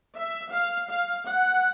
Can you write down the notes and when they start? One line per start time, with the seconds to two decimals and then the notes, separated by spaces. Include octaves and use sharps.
0.14 E5
0.51 F5
0.89 F5
1.27 F#5